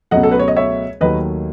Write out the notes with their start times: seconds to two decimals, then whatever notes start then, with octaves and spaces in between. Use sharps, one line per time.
0.11 C#2 B2 F#3 A3 D#5 F#5
0.23 A4
0.32 B4
0.39 C#5
0.48 D#5
0.56 C#5 E5
1.01 D#2 D#3 F#3 A3 B4 D#5